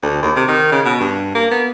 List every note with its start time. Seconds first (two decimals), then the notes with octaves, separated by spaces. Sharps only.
0.03 D2
0.23 D#2
0.36 C3
0.48 D#3
0.72 C#3
0.86 B2
1.00 G2
1.35 A#3
1.51 B3